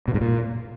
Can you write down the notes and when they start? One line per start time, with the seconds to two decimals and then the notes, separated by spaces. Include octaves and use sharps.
0.08 B2
0.14 G#2
0.21 A#2